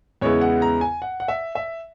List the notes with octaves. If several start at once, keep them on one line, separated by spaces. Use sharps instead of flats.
E2 C#3 G#3 B3 E4 C#5
F#5
A#5
G#5
F#5
F#5
E5
E5